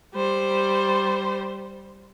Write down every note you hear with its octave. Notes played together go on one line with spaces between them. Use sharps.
G3 C5